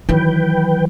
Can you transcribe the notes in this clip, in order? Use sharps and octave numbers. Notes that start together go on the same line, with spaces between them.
D#3 E3 F#3 B4 G5